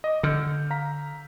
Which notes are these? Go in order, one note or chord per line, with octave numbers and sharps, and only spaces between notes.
D#5 D6
D3 E6 F6 G6
F5 A#5 B6